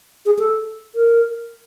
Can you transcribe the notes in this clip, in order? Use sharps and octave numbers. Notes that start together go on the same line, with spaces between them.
G#4
A4
A#4